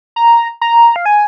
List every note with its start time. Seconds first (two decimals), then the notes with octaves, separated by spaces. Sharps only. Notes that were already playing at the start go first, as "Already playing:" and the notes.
0.16 A#5
0.61 A#5
0.96 F5
1.06 G#5